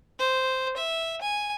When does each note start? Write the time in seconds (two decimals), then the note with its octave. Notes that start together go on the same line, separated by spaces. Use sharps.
0.19 C5
0.77 E5
1.21 G#5